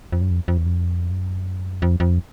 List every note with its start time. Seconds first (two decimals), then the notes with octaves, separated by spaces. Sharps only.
0.12 F2
0.21 F#2
0.31 F2
0.48 F2
0.57 E2
0.66 F2
1.11 F#2
1.82 F2
2.00 F2